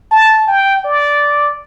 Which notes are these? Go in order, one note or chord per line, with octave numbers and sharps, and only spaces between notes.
A5
G5
D5